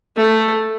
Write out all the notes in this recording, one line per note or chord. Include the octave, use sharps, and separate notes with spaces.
A3